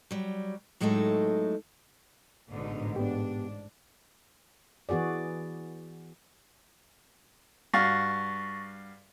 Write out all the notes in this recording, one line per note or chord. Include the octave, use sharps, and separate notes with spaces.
F#3 G3
A2 F#3 G#3 A3 D#4 A4
A1 G#2 B2 D3 D#4
B3 D4 G4
E3 B3 F#4 G#4 D5
G2 F#4 F5 C#6 A6 A#6